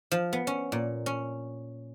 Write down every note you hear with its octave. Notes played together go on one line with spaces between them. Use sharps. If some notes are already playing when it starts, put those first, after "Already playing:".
F3
B3
C#4
A#2
C#4